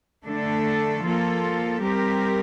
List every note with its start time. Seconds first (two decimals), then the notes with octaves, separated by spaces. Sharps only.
0.25 D3 A3 D4 A4
1.03 F3 A#3 F4 A4
1.82 G3 C4 G4 A#4